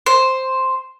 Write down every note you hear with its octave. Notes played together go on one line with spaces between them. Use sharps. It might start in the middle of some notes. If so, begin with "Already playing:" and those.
C5